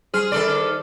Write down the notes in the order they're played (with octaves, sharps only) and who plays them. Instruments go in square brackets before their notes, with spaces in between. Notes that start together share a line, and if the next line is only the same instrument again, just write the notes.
[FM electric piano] G3 C5 F6 [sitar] G#4
[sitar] D#3 A4 D5